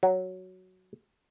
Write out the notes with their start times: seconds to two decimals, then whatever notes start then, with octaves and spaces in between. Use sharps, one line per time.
0.03 F#3